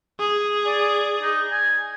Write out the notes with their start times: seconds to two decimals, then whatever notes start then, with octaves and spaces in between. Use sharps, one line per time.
0.20 G#4
0.66 D5
1.22 D#4
1.52 G#5